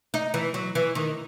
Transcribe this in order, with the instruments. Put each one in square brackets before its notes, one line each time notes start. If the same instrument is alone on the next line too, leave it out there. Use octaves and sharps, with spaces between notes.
[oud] D#4
E3
F#3
E3
D#3